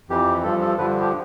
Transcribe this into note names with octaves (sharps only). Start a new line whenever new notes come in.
F2 E3 G4
G2 F3 A4
A4
G2 D3 F3 B4
G4